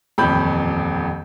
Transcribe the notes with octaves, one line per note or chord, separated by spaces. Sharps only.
D#1 A1 F2 B5 G6